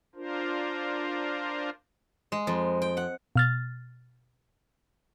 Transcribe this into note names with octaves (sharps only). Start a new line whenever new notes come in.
D4 F4 A#4 C5
G#3
F2
G5
F#5
B2 F6 A6